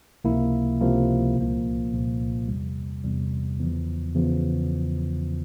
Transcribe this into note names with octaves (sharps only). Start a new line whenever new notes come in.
C#2 C3 F3 A#3 E4
C#2 C3 F3 A#3 E4
C2 A#2 F3 A#3
C2 A#2 F3 A#3
E2 C3 G3
E2 C3 G3
E2 C#3 F3
E2 C#3 F3